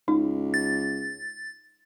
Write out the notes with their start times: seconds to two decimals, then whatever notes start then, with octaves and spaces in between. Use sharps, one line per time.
0.08 C#2 D#4
0.54 A6